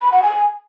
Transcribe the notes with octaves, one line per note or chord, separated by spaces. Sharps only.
B5
F#5
G#5